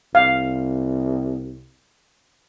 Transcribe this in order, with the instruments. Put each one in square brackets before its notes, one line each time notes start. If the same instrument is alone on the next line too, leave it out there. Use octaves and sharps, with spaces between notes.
[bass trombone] C2 [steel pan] F5